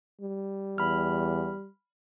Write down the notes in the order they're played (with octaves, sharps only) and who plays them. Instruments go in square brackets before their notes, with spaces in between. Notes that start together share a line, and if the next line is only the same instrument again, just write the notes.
[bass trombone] G3
[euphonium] E2 [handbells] B5 F6